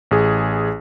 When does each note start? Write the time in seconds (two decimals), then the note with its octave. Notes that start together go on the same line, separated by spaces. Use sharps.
0.11 A1 G#4